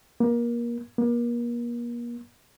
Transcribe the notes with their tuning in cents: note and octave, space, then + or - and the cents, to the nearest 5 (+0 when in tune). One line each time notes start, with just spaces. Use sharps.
A#3 +25
A#3 +35